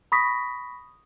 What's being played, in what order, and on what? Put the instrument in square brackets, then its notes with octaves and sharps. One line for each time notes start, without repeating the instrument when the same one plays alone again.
[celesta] B5 C#6 D#6 A#6 B6